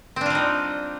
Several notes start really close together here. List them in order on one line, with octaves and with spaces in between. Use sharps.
C4 D4 F4 G3 D#4